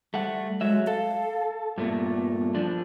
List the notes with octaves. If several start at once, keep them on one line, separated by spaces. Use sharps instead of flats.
G3 A3 F#5
F#3 G#3 E5
A4 F5
G2 A#2 A3 B3
F3 D4